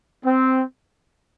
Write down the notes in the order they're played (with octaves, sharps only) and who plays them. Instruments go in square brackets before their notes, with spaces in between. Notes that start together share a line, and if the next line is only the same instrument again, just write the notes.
[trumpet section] C4